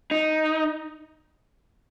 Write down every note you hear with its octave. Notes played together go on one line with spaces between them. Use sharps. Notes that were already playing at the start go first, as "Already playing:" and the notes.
D#4